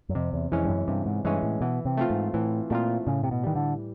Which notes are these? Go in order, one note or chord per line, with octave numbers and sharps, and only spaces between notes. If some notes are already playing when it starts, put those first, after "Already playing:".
F#2
F2 C3
E2
F2 E3 G#3 C#4
G2
F#2
G2 C3
G#2
G2 E3 G#3 C#4
A2
B2 E3
C3
A3 C4 F4
G#2
A2 E3
A#2 A3 C4 F4
A2 C#3
C3
B2
D#3 E3 G3
D3